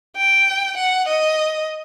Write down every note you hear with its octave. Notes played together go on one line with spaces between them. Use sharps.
G5
F#5
D#5